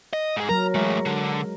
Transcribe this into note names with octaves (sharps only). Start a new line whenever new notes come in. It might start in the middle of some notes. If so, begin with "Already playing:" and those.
D#5
G#2 G#4
F#3 A#4 A#5
E3 G#3 A3
D3